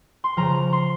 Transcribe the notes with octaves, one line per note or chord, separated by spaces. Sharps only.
C6
C#3 F3 A#5
A#5
C6